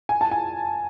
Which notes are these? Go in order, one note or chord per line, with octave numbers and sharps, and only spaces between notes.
G#5
A5
G#5